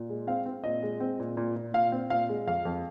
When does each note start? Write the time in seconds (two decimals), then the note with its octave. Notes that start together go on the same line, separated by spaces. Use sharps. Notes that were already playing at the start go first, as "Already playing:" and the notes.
Already playing: A#2
0.09 G#3
0.27 C4 F5
0.46 C4
0.64 A#2 D#5
0.83 G#3
1.00 C4
1.19 A#2
1.37 A#2
1.56 A#2
1.74 A#2 F5
1.92 C4
2.10 A#2 F5
2.29 G#3
2.47 F2 F5
2.65 F2